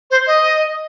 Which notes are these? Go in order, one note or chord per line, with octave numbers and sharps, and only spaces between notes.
C5
D#5